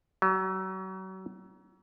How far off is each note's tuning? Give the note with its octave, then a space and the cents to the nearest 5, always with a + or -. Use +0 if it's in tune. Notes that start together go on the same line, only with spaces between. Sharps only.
F#3 +35